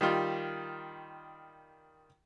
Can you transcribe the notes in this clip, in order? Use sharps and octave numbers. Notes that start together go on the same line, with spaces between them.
D#3 G3 F4